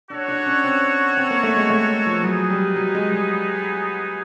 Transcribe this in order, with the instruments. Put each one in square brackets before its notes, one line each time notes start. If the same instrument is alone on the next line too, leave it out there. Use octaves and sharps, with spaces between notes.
[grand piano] D4 [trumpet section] F#4 A4 C#5 F#5
[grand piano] D4
C#4
C4
C4
A#3
A3
G#3
A3
F3
[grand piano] F#3 [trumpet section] B3 D#4 G#4
[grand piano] G3
F#3
G#3
G3